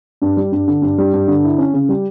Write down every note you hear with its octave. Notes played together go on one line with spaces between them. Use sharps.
G2
G3
G2
D3
G2
G3
G2
D3
E4
C#4
C#3
G3